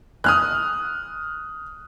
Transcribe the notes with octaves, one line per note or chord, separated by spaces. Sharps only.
D#6 F6 F#6